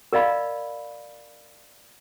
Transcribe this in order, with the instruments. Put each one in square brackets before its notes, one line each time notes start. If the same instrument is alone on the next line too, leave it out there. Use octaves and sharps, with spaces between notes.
[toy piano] A#4 D5 D#5 F5 B5